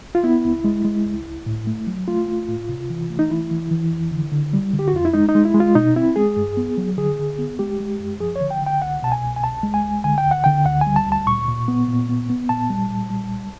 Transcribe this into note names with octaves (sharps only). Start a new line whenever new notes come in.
F4
B3 E4
C#2
G#3
G#3
C#2
C#2
A2
A3
F#3
A3 F4
A3
A2
C3
E3
A3
D#4
E3 E4
E3
E3
F2
D3
D3
G3
D3
G4
F#4
F2 F4
E4
G#3 D#4
D#4
G#3
E4
G#3
F4
B2 D#4
C4 E4
G#3 G#4
G2
B3
F#3
D3 G#4
D3
B3
G#3 G4
G#3
F#2
F3 G#4
C#5
D3
G5
D3 G5
C2 F#5
B2 A5
G#5
C2
G#5
C2 A5
G#3
G#5
C2
D3 G#5
G5
D2
F#5
D3 G5
D2 F#5
G#5
G3
A5
D2
A5
A#2 C#6
A#2
B3
A#2
B3
B3
A#2 A5
G3
A#2
G3
C2